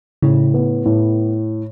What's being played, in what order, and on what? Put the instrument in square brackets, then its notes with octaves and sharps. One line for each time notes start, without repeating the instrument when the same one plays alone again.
[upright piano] A2 [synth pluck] C#3
[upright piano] B3
A2